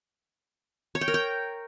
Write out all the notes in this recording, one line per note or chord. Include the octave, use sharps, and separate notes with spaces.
C#5
G5
A#4
G5